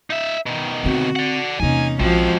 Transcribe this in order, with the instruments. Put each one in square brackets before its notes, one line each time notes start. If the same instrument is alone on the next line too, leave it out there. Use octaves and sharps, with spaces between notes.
[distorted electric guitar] D#4 E5
B2 D#3
[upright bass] D3 C4 [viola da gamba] F#4
[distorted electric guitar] D5 F#5
[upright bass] E2 C3 [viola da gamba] A#3 C#4 D#4 [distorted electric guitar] G#5
[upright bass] A#1 [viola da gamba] F3 F#4 [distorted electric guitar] G#3 C4